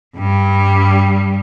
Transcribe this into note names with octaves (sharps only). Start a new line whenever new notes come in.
G2 G3